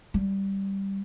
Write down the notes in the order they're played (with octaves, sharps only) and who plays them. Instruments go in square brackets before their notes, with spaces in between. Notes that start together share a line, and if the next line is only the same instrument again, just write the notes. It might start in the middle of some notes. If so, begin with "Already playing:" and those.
[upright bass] G3